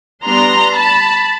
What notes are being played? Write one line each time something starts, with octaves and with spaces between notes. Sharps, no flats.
G3 B3 D4 A#5 C6
A5 B5